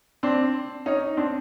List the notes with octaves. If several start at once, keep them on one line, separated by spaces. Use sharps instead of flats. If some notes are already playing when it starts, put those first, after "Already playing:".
C4 D4
C#4 D#4
C4 D4